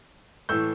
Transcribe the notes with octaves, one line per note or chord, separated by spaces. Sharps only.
A2 E3 A3 E6 G6